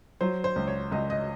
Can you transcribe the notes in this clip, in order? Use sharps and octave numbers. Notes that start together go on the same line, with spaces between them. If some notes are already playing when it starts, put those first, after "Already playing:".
F#3 C5
C5
C#2
C#5
C#2 D#5
D#5